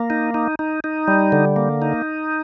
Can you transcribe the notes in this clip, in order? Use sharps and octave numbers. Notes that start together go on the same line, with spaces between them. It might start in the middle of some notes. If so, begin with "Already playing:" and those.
Already playing: A#3
D#4
D#4
D#4
D#4
G3
D3
A#3
D#4